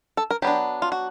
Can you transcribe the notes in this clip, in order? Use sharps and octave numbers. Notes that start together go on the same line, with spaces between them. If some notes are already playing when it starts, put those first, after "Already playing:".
A4
A#4
F#3 B3 D4 G4
F4
F#4